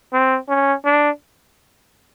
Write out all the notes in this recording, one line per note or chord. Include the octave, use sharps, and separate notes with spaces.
C4
C#4
D4